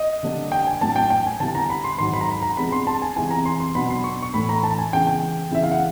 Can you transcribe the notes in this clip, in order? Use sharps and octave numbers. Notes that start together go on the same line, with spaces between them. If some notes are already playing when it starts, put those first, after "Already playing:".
Already playing: D#5
D3 G3 A#3 D4
G5
G#5
A2 F#3 A#3 D4 A5
G5
G5
G#5
D3 G3 B3 E4 A5
A#5
B5
C6
G#2 D#3 F#3 C6
B5
A#5
B5
A#5
C3 F3 G#3 B3 D4 B5
C6
A5
G#5
C3 E3 G#3 B3 E4 G#5
A#5
C6
C6
B2 F#3 B3 D4 B5
C6
C#6
C#6
A2 E3 A3 D4 B5
A#5
A5
G#5
C#3 E3 G#3 B3 G5
G5
C#3 E3 G#3 B3 E4 E5
F5
F#5